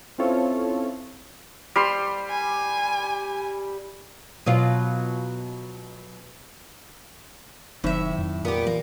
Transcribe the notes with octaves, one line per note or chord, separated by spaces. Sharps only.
C4 C#4 E4 F4 A4 C#5
G3 C6
G#5
B2 F#3 F4
F1 A2 D#3 F#3 D#4 E5
F2
F2 A#2 B3 G4
E3 A#3